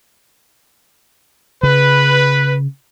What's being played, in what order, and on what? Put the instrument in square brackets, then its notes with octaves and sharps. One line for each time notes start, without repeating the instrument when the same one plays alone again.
[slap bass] C#3 [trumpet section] B4